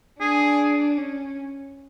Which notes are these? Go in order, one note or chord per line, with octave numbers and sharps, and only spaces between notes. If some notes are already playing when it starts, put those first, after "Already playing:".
D4 G#4
C#4